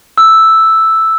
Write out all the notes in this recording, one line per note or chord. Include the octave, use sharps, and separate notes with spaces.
E6